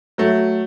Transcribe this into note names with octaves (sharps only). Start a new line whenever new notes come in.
F#3 A3